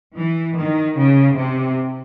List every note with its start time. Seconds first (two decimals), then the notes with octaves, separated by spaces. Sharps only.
0.18 E3
0.58 D#3
0.97 C#3
1.38 C3